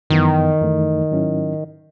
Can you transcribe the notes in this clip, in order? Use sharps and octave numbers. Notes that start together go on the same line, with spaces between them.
F#2 D#3 E3 B3
F#2 E3 A3 D#4
G#2 F#3 C#4 E4